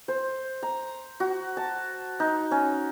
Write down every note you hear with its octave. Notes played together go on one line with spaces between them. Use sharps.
C5
A#5
F#4
A5
D#4
C#4